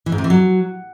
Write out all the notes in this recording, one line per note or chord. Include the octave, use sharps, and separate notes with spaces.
E3
G#2
C3
E3
F#3